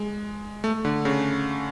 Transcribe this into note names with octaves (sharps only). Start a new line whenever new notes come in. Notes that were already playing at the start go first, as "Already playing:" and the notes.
Already playing: G#3
A3
D3
C#3